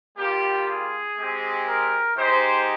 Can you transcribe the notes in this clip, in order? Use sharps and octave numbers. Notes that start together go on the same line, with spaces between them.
G3 A#3 F4 G4
G#4
G#3 C4 G4
A#4
G#3 D#4 G4 C5